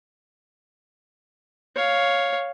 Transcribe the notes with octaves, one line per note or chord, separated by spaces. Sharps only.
C#5 F5